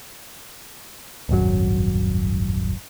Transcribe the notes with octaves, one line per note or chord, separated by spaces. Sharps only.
D#1 G#1 F#2 F#3